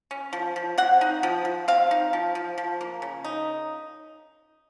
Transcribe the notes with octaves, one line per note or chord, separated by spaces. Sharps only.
C#4
F3
F3
C4 F#5
D#4
F3
F3
C4 F5
D#4
F3
F3
F3
A#3
C#3
D#4